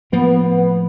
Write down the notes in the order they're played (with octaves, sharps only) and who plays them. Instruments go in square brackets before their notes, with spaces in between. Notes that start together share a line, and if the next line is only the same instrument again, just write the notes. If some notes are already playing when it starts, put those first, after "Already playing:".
[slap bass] A2 F3 A#3 [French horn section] B3
[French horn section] B3